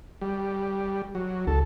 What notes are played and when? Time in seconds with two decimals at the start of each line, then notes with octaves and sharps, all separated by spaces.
0.21 G3
1.15 F#3
1.47 C#2 A4